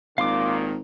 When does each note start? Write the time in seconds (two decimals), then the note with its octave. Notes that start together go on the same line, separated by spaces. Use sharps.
0.18 G#1 A#2 D#3 F5 C6 D6